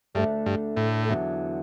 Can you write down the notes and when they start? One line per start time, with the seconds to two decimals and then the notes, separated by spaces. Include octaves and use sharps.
0.15 D2 G2 D3 A3 D4
0.46 G2
0.77 A2
1.08 E2 D3 F#3 B3